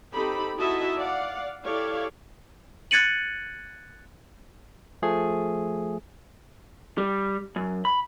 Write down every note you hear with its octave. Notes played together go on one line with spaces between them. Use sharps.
C4 D#4 G4 A4 B5
D#4 E4 F#4 D#5 E5 A5
D5 F5 F#5
E4 G4 A4 C#5 D5 F5
F#6 G#6 A6 C#7 D#7 F#7
F3 A3 G#4
G3
F#2
B5